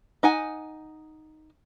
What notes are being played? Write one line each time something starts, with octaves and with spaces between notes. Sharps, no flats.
D#4 F#5 G#5